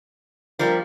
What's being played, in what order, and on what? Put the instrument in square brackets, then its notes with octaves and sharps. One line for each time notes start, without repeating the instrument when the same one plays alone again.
[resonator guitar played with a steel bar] F3 G3 [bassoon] A#3